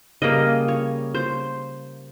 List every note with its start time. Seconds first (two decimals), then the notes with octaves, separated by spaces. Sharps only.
0.22 C#3 G3 A#3 D#5
0.68 C#5
1.15 C5